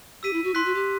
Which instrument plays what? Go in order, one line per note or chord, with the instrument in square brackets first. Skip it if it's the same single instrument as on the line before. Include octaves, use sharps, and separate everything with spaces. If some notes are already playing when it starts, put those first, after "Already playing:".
[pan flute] G4 [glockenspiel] E6 B6 D#7
[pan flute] E4
F#4
[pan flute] E4 [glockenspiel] C6 F#6 B6
[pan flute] F#4
G4